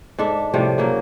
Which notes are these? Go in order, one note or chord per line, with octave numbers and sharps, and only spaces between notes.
G#2 D4 A4 E5
A2 C3 F3 G3
C#3 F#3 A#3